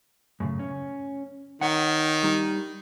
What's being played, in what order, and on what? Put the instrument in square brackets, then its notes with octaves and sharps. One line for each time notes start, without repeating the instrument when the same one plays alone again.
[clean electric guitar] F#2 A2 C#3
C#4
[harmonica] D#3 [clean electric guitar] C#5 F#5
[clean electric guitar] G3 D#4